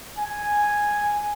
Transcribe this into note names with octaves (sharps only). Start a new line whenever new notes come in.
G#5